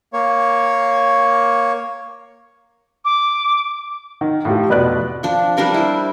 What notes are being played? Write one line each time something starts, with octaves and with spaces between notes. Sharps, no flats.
A#3 C#5
D6
D#3
A2 F3 G4
F1 B2 B3 B4 D5 F#6
F3 D4
G3 D4 A#4 B4
E4 C5